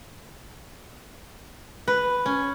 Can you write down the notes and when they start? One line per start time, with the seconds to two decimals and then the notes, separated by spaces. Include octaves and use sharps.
1.88 B4
2.26 C#4